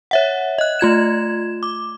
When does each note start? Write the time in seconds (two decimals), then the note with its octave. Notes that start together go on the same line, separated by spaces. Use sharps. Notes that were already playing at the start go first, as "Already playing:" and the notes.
0.11 C#5 E5 F#5
0.58 D#5 F#6
0.79 A3 F4 G#6 E7
1.63 D6